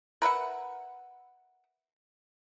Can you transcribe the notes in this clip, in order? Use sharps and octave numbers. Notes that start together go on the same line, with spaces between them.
A#4 B4 E5 F#5